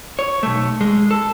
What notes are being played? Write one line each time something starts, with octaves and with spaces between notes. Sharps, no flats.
C#5
B1 A3
G#3
A4